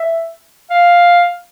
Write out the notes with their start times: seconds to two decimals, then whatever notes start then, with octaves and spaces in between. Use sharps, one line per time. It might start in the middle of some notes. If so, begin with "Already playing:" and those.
Already playing: E5
0.70 F5